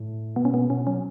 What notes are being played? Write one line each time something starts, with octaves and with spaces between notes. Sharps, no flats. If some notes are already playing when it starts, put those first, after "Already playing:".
Already playing: A2
B2 B3
C#4
B3
B2 C#4
F#3 C#4